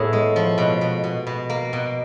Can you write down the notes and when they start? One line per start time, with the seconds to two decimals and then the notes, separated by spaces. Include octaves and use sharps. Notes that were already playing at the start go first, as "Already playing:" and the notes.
Already playing: A2 B3 G#4
0.13 G#3
0.36 F3
0.58 B2
0.81 B2
1.04 B2
1.27 B2
1.50 A#3
1.73 B2